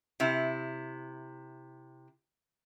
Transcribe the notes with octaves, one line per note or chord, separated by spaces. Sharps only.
C3 E4